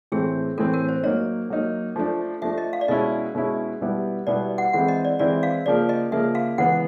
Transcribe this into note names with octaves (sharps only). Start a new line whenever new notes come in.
A2 E3 A3 C4 G#4
A2 E3 A3 C4 A4
A#4
C5
F#3 A#3 D#4 C#5
F#3 A#3 D#4
F3 A3 D4
F3 A3 D4 E5
D#5
F5
D5
B2 G#3 C#4 E4 D#5
B2 G#3 C#4 E4
B2 G3 B3 E4
B2 G3 B3 E4 D5
F#5
E3 G#3 C4 E4 F#5
D#5
D5
E3 G#3 C4 E4 D5
F5
C#3 F3 A#3 D5
D#5
C#3 F3 A#3 E5
F5
C#3 E3 G#3 B3 F#5